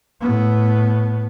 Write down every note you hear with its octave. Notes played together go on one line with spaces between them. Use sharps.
A2 B3